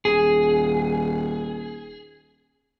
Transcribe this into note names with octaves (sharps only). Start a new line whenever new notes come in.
D#1 G#4